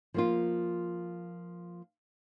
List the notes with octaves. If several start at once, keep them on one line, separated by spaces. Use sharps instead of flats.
F3 A#3 F4